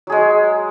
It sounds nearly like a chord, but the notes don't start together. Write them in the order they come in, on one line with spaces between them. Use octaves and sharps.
F#3 G#4 G#3